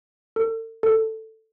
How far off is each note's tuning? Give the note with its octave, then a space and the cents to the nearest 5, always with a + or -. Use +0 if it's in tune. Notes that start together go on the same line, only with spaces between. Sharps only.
A4 +40
A4 +10